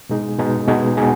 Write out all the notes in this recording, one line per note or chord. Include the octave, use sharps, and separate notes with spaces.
B2 G#3 D#4 G#4
B2 G#3 D#4 G#4
B2 G#3 D#4 G#4
B2 G#3 D#4 G#4